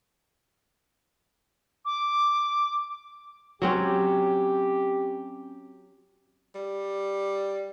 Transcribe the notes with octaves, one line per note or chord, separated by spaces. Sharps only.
D6
F#3 C4 C#4 G4
G3